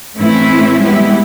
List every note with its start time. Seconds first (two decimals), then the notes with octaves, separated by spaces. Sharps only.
0.16 A2 E3 A3 C4 C#4 E4
0.78 G3 G#3 B3 E4 G4